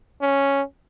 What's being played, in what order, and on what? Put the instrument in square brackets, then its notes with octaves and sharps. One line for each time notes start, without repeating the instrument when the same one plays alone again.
[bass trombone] C#4